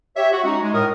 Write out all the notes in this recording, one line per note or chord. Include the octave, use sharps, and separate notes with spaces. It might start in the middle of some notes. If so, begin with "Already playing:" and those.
G4 C#5 E5
F#4
G#3 C#4 D#4 F#4
G#3
A2 A#4 D#6